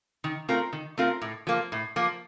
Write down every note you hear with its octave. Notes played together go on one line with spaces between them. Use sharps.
D#3
A3 C4 F4 A#4
D#3
A3 C4 F4 A#4
A2
F3 A#3
A2
F3 A#3